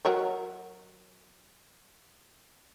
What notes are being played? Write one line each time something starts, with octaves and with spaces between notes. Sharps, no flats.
F#3 A#4 C#5